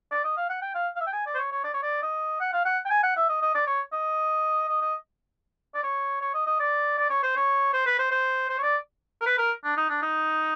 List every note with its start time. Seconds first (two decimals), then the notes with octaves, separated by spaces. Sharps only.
0.12 D5
0.24 D#5
0.37 F5
0.49 F#5
0.62 G5
0.75 F5
0.96 F5
1.01 E5
1.07 G5
1.13 G#5
1.26 D5
1.35 C5
1.38 C#5
1.52 C#5
1.64 D5
1.74 C#5
1.83 D5
2.03 D#5
2.40 F#5
2.53 F5
2.65 F#5
2.86 G5
2.90 G#5
3.03 F#5
3.16 E5
3.29 D#5
3.42 D#5
3.55 D5
3.67 C#5
3.92 D#5
4.69 D#5
4.81 D#5
5.75 D5
5.84 C#5
6.21 C#5
6.34 D#5
6.47 D#5
6.60 D5
6.98 D5
7.10 C#5
7.23 C5
7.36 C#5
7.73 C5
7.86 B4
7.99 C5
8.11 C5
8.50 C5
8.58 C#5
8.63 D5
9.22 A#4
9.26 B4
9.38 A#4
9.64 D4
9.77 D#4
9.90 D4
10.02 D#4